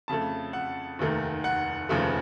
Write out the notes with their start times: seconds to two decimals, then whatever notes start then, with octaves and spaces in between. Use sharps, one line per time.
0.08 F2 C#3 A3 A5
0.53 F#5
0.99 F1 D#2 D#3 A3
1.44 F#5
1.89 F1 D#2 C#3 F3 A3